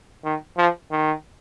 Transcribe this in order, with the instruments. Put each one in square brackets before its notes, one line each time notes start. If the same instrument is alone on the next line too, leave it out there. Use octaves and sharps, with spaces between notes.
[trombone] D#3
F3
D#3